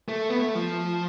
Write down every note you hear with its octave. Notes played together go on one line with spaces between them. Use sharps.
A3
B3
A3
F3